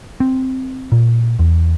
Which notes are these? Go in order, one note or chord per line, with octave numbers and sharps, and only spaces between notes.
C4
A#2
E2